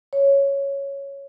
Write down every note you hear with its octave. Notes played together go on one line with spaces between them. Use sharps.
C#5